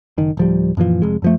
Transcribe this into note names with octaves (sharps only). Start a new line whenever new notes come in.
F#1 D#3
D1 F3 G3
F#2 A#2 E3 F3
F1 F2 G#3
F#2 F3 A3